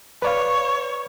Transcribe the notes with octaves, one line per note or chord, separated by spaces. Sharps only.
B4 C#5 D5 F5